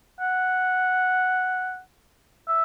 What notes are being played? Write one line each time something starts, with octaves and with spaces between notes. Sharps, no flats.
F#5
E5